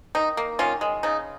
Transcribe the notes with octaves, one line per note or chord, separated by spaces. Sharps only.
D#3 D#4
A#3
D#3 C#4 F4
G#3
C#3 D#4